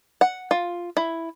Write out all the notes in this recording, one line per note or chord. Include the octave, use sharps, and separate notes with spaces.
F#5
F4
E4